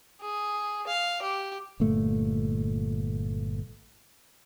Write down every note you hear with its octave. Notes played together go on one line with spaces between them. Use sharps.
G#4
F5
G4
G1 A#2 A3